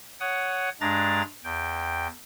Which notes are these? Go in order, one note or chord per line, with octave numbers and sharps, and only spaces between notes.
C#5 F#5 D#6
G2 G#3 D4 A#5 A6
E2 G5